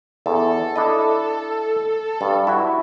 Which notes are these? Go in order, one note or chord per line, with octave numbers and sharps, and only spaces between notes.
E2 A4
D4 E4 D#5
G2
E4 F#4 E5